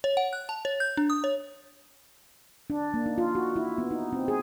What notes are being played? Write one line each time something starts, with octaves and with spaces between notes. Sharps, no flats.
C#5
F#5
F#6
A5
C#5
G6
D4
D#6
C#5
D4
A#3
D#4
F4
F#4
E4
B3
D#4
C4
G#4